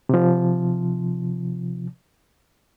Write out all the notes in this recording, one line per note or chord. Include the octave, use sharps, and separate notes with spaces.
C3 F3